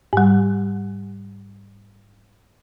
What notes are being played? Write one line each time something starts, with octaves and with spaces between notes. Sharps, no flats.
G#2 G3